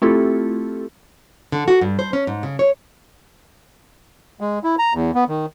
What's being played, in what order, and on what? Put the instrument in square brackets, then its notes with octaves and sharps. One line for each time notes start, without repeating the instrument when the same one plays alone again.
[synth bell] A3 C4 E4 F4 G4 A4
[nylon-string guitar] D3
F#4
G2
C5
C#4
G#2
C#3
C#5
[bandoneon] G#3
E4
A#5
E2
B3
D#3